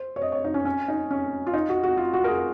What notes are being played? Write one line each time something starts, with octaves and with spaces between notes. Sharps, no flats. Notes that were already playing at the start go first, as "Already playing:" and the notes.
Already playing: C5
C#5
D#5
C#5
D#4
C#4
C#4
D#4
C#4
F4
D#4
F#4
F#4
F4
F#4
A#4
G#4